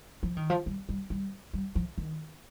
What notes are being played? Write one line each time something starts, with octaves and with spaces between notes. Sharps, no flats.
F3
D#3
F3
G3
G3
G3
G3
F3
D#3